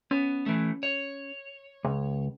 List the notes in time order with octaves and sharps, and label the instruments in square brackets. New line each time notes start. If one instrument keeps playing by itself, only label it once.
[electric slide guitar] B3 [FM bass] C#4
[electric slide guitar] E3 A3
C#5
[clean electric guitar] C#2 [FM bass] C#3